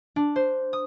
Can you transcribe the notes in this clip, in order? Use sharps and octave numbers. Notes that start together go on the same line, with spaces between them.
D4
C5
D#6